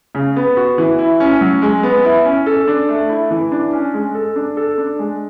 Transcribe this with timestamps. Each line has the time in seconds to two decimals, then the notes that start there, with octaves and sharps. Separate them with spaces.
0.15 C#3
0.36 B3
0.57 F#4
0.78 E3
0.99 E4
1.20 C#4
1.41 F#3
1.62 G#3
1.83 B3
2.05 E4
2.25 C#4
2.46 A4
2.68 D4
2.89 A3
3.10 E4
3.31 E3
3.52 D4
3.73 C#4
3.94 G#3
4.15 A4
4.36 D4
4.57 A4
4.78 D4
4.99 G#3